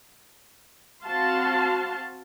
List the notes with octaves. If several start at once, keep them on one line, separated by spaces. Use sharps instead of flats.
C4 F#4 F5 A5 C6